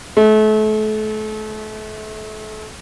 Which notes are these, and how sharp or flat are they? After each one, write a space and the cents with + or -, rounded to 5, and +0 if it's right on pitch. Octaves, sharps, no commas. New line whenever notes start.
A3 -35